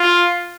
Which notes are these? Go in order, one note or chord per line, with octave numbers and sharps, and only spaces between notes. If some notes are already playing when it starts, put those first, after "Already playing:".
Already playing: F4